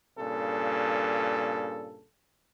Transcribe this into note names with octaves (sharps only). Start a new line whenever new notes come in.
G2 A#2 C#3 A4